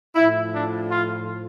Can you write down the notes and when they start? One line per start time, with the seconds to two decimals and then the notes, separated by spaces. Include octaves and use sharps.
0.15 A2 F3 E4
0.54 D4
0.91 F4